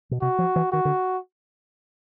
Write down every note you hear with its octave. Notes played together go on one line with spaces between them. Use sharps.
B2
C3 F#4
F3
E3
D#3 F#4
D3